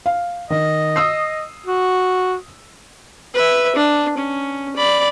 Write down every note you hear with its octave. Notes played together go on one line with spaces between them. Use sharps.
F5
D#3 D#5
D#6 E6 C7
F#4
B4 E5
D4
C#4
D5 B5